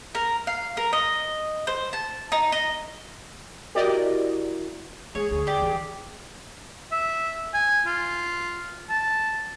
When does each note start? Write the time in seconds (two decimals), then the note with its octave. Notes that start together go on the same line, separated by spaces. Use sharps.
0.15 A#4
0.47 F5
0.77 A#4
0.93 D#5
1.67 C5
1.93 A5
2.32 D#4
2.52 D#5
3.75 E4 F#4 G4 A#4 D5 D#5
5.15 G#3 G#4 C#5
5.31 D2 G#4
5.47 G4 D5
5.62 E3
6.92 E5
7.54 G#5
7.86 F4
8.90 A5